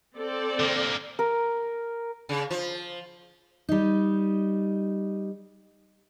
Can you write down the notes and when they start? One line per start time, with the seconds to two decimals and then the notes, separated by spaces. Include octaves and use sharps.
0.16 C4 A4 D5
0.60 D3 A#3
1.19 A#4
2.29 C#3
2.51 F3
3.69 G3 D#4